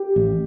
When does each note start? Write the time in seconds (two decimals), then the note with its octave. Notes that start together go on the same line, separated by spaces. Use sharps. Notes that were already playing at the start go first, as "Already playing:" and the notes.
Already playing: G4
0.16 A1